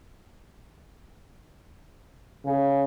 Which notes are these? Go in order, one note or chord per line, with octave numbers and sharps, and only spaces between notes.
C#3